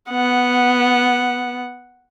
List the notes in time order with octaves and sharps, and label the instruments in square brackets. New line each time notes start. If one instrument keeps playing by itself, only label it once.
[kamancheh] B3 [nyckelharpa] F#5